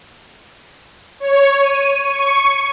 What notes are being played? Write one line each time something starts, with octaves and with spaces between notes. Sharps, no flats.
C#5
D#7
C#6